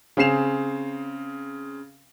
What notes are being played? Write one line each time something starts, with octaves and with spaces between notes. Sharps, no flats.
C#3 C4 G#4 C7 E7 F7